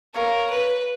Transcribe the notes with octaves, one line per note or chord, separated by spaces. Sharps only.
A#4 C#5 F5 A#5 C#6
B4